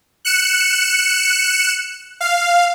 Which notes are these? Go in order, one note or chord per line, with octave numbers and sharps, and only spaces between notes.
F#6 C#7 E7
F5